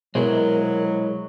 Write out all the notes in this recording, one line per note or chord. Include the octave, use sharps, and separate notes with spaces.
B2 F#3 G#3 E4 G#4 A#4 C5